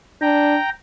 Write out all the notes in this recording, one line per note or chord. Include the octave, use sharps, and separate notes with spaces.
D4 G5 A#5